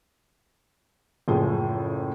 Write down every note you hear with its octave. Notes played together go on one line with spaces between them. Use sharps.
F#1 A2 F3 G#4